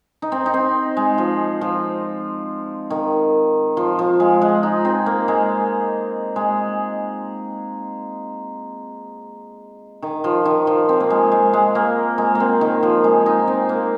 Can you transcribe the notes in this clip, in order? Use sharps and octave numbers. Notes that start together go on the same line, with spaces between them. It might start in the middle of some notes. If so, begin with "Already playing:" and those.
D#4
C4
D#4
C4
G#3
F3
F3
D#3
F3
F3
G#3
G#3
D#4
C4
A#3
G#3
G#3
D#3
F3
D#3
F3
C4
A#3
G#3
G#3
G#3
A#3
G#3
A#3 C4
D#3
F3
G#3
D#4
C4
A#3